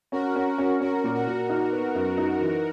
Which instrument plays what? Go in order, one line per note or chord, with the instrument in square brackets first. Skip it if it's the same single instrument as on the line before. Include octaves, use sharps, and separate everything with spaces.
[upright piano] C#4 [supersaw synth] F#4 A#4
[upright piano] C#4
C#4
[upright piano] C#4 [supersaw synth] F#4 A#4
[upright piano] A#2
[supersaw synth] F#4 A#4
[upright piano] A#2
D#4
B3
F#2
D#4
E3